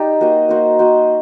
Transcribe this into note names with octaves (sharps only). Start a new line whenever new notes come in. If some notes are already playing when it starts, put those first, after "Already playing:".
Already playing: D#4 G4 D5
A#3 F#4 C5 D#5
A#3 F#4 C5 D#5
A#3 F#4 C5 D#5